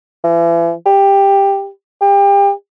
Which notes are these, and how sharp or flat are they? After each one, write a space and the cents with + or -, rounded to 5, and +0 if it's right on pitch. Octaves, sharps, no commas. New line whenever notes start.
E3 +40
G4 +10
G4 +30